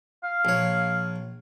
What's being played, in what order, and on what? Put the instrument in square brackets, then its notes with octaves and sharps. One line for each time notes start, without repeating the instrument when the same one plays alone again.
[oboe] F5
[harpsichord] A#1 C#5